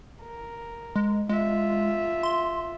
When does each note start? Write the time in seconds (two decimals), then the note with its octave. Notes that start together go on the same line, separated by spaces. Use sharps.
0.22 A#4
0.96 G#3
1.29 G#3 F4 E5
2.23 C6